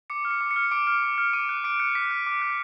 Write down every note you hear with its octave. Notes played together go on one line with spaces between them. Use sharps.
D6 C#7
F6
C#7
D6
C#7
F6
D6 D7
F6
D6
F6
D6 D#7
F#6
D6 D7
F#6 C#7
D6 B6
F#6
D6
F#6